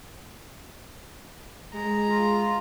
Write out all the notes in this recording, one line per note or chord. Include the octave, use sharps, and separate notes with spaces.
G#3 A#5
F4